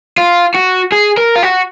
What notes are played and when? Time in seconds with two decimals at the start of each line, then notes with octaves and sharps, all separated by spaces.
0.18 F4
0.54 F#4
0.92 G#4
1.18 A#4
1.36 F4
1.43 F#4